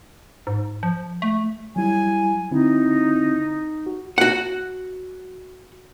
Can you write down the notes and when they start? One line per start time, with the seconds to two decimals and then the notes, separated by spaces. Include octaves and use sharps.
0.47 G#2
0.83 F3
1.22 A3
1.76 F#3 G3 E4 G#5
2.51 D3 C4 D#4 E4
3.86 F#4
4.18 F#4 F#5